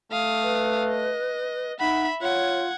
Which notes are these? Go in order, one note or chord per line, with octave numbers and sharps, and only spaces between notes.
A3 F5 D#6
B4
D#5
D#4 E5 F#5 B5
F4 C#5 F#5 G#6